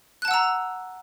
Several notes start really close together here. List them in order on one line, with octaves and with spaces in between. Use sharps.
F#6 A5 F#5 E6 A#5